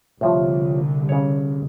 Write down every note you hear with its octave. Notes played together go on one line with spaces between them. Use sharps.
C2 A2 D3 F3
C#3 C#5